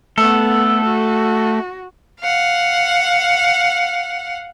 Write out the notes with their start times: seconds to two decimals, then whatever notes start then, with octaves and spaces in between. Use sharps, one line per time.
0.18 A3 B3 A4 F#5
0.85 F#4
2.21 F5 F#5